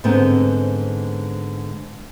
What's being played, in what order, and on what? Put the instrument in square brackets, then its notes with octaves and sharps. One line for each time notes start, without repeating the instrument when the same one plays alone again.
[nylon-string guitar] G#2 D3 B3 C4